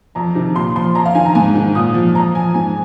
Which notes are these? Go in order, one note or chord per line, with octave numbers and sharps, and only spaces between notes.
F2 A#5
C3 D#3
A#2 C6
F3 C6
F2 A#5
F5
D#3 G#5
A#5
G#2 G#5
D#3
A#2 D#6
F3
F2 A#5
F3 G#5
G#2 G#5